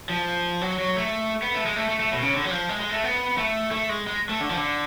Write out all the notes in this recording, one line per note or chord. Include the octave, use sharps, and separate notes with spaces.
F3
F#3
F#3
A3
B3
A3
G#3
A3
A3
A3
B2
C#3
D3
F#3
F3
G#3
G#3
A3
B3
A3
A3
G#3
G#3
A3
D3
F3
D3